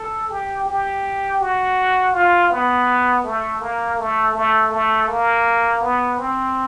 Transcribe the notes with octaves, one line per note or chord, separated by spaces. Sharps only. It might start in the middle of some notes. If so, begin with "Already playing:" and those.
Already playing: A4
G4
G4
F#4
F4
B3
A3
A#3
A3
A3
A3
A#3
B3
C4